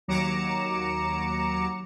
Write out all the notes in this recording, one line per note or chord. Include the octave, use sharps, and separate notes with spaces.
D#2 F#3 A#5 D6 C#7 E7